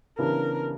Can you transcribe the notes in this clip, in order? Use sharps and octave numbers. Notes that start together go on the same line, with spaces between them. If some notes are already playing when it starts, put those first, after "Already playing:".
C#3 E3 B3 D4 G4 A#4